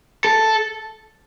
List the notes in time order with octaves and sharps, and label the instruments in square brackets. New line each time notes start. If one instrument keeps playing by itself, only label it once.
[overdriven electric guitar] A4